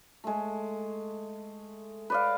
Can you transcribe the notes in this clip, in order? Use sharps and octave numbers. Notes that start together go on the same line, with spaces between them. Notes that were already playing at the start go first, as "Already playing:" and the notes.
G#3 A3
B4 D5 F5